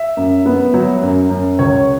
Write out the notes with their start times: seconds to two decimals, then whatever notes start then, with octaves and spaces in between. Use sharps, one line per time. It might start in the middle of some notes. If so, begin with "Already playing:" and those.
Already playing: E5
0.17 F#2
0.46 B3
0.74 F#3
1.02 F#2
1.30 F#2
1.59 C#2 C#5